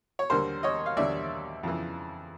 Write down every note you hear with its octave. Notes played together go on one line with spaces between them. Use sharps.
C#5
D#2 D3 G3 A#4 C5
C#5 D#5
F5
D#2 D3 G3 D5 E5
F2 C#3 E3